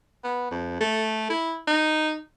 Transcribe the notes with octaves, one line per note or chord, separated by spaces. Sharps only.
B3
F2
A3
E4
D#4